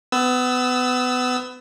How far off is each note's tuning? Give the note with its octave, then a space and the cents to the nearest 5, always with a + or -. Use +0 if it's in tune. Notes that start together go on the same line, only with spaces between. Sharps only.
B3 +25 E6 -10